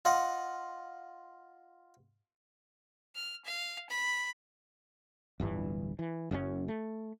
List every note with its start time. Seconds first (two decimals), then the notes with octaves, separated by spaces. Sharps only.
0.05 F4 D#5 F#5
3.15 F6
3.45 F5
3.89 B5
5.40 D1 G1 G2 E3
5.99 E3
6.31 F#1 F#2 B2 C#4
6.68 A3